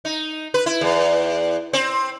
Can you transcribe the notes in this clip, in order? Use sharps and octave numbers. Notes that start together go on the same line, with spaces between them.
D#4
B4
E4
E2
C4